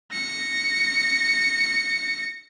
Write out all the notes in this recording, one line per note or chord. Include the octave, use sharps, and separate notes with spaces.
A#6 C#7